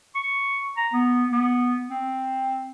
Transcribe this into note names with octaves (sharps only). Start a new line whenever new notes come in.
C#6
A#5
B3
B3
C4